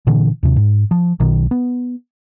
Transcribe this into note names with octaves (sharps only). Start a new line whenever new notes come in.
A#2 D3 E3
D#2 C3
G#2
F3
B1 B2 D#3
B3